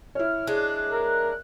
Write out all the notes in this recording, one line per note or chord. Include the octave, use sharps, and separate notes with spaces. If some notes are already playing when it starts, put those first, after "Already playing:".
E4 C#5 F6
G#3 D4 F#6
A#4